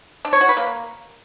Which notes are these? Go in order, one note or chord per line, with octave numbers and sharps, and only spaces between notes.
D4
C#5
F#4
B4
A#3